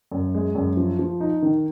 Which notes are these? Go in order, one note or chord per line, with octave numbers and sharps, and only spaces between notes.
F#2
G#3
F#2
F3
F3
D#4
D#3